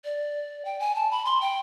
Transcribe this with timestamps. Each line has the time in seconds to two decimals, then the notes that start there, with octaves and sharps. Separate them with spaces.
0.05 D5
0.65 G5
0.80 G#5
0.95 A5
1.11 B5
1.25 C6
1.41 G5